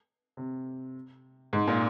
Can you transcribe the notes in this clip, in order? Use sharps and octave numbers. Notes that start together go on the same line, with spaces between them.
C3
G#2
A#2